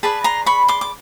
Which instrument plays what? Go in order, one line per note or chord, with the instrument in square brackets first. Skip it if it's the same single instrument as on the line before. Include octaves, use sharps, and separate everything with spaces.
[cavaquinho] G#4 B4 D5 A5 B5
A#5 C6
B5 C#6
C6 D6
D6